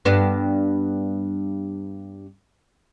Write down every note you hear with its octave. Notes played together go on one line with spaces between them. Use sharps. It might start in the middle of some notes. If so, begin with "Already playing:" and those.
G2 B3 D4